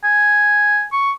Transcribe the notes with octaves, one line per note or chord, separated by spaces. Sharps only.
G#5
C#6